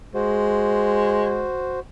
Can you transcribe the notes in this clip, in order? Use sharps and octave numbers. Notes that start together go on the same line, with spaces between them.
G#3 F#4 C5